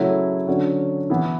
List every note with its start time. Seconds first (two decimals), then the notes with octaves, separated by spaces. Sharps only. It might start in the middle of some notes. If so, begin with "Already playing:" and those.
Already playing: C#3 F#3 A3 E4
0.47 D3 F#3 C#4 F#4
1.10 E3 B3 E4